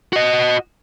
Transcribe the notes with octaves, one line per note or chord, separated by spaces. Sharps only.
F#4 D#5